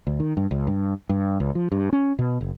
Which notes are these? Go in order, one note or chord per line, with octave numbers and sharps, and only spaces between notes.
D2
D#3
G2
C#2
G2
G2
C#2
F3
G2
C#4
B2
F#1